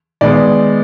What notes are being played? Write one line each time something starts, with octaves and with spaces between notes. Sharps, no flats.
D#3 G#3 B3 D5